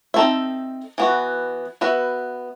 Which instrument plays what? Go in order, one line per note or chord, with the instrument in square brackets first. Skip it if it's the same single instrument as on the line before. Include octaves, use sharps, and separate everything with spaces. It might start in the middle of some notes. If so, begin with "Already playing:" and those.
[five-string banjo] C4 D#4 A4 E5
E3 B3 F#4
B3 F#4 B4 E5